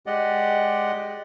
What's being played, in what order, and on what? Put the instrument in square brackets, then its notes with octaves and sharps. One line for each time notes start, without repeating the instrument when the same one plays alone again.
[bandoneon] G#3 G4 D5 D#5 F#5